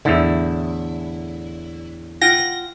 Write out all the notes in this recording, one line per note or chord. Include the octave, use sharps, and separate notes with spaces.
E2 A2 D3 E4
F4 F#5 G5 A#6